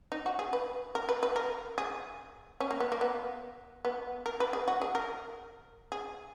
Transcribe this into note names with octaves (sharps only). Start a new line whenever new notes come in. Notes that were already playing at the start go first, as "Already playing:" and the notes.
D#4
F#4
G#4
B4
A#4
B4
B4
A#4
G#4
C#4
A#3
B3
A#3
B3
B3
A#4
B4
G#4
F#4
G#4
A#4
G#4